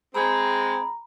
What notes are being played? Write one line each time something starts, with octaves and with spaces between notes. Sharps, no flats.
G#3 C4 A#5 B5